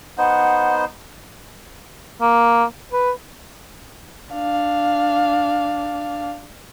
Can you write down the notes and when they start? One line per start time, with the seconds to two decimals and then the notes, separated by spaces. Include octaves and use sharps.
0.18 B3 D#4 C5 F#5
2.21 A#3
2.93 B4
4.34 D4 F5